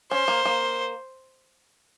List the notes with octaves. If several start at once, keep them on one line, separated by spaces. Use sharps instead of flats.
C#4 C5
A#3
A#3